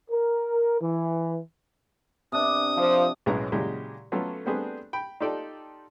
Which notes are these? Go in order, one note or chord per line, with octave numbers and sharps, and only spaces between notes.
A#4
E3
C3 D4 D#6
F3
B1 A2 G#3 B3 C#4 A#5
A#2 C#3 F#3 G#3 E4 G4
F#3 A3 B3 C#4 F4 A4
G3 A3 B3 C4 D4 G#4
G5 B5
D#4 F4 G4 A4 D5 G5